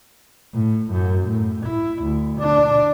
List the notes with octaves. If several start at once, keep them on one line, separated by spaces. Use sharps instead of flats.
A2
F#2
A2
E4
D2
D4